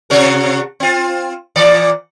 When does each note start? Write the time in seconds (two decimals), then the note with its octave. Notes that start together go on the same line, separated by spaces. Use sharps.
0.10 C3 F#4 A#4
0.80 C4 F4
1.56 A#2 E3 D5